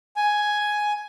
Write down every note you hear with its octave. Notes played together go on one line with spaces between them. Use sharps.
G#5